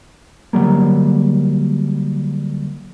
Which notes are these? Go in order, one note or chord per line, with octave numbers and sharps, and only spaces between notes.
D3 F#3 G3 A#3